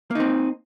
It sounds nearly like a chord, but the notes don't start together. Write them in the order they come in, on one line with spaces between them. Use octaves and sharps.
A#3 D#4 C4